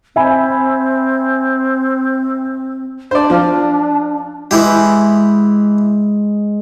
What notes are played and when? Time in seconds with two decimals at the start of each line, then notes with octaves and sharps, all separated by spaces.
0.16 C4 E5 G#5 B5
3.11 D4 C5 D5
3.30 F3 F4
4.51 E3 G#3 E4 G4